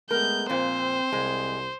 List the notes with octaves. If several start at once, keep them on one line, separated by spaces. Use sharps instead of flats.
G#3 A3 B3 A#4 G6
F2 A#2 C4 C5
C2 C3 G#3